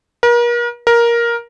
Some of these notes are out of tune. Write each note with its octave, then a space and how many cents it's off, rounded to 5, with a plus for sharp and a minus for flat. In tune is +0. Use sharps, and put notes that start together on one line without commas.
A#4 +40
A#4 +10